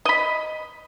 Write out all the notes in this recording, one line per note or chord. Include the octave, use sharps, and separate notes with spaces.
D#5 B5